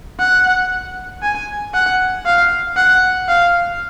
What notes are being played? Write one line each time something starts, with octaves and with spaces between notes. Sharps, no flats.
F#5
G#5
F#5
F5
F#5
F5